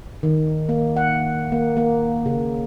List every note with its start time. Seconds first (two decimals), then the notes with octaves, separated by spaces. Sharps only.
0.23 D#3
0.69 A#3
0.96 F#5
1.52 A#3
1.77 A#3
2.26 C#3